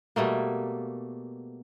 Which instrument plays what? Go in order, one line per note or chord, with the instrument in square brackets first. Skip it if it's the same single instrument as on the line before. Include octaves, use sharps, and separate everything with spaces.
[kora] B2 G3 A3 A#3